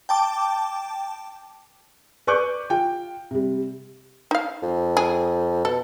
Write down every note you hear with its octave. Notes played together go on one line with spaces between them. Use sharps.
G5 A5 D6
B4 D5 C#6 D6 F#6 G6
F4 G5
C3 G3
D#4 F5
F2
G#4
B2 A4